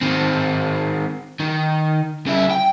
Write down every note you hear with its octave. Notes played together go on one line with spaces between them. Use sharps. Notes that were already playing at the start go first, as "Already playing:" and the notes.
D#3 C4
D#3
C#3 E4
G5